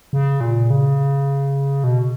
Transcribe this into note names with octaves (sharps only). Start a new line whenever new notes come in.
C#3
A#2
C#3
B2